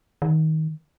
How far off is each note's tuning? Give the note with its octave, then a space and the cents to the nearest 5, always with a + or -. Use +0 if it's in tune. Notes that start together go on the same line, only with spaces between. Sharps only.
D#3 +20